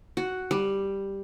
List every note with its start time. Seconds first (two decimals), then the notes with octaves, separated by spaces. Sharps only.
0.17 F#4
0.51 G3